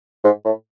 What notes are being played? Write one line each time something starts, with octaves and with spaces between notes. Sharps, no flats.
G#2
A2